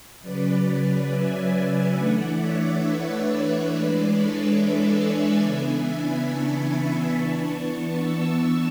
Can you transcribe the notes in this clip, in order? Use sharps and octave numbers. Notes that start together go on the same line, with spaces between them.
C#3 F#3 C#4 B4 D5
E5 G#5
E5 G#5
E3 A3 D4 D5 F#5
C#5 E5
B4 D5
C#5 E5
E3 G#3 D4 B4 D5
A4 C#5
C#5 E5
E5 G#5
C#3 E3 B3 D4 E5 G#5
G#5 B5
A5 C#6
G#5 B5
E3 B3 D4 A5 C#6
C#6 E6